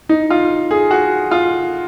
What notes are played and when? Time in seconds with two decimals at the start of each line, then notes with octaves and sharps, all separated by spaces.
0.09 D#4
0.30 F4
0.71 G#4
0.91 F#4
1.31 F4